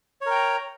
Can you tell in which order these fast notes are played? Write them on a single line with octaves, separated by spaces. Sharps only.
C#5 A#4 G5 A#5